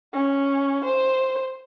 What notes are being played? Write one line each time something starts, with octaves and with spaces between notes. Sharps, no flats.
C#4
C5